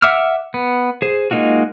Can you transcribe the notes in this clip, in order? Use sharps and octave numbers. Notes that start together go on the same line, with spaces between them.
E5 F#5 D6 E6 F6
B3
G#4 C5
G#3 A#3 D#4 F4 F#4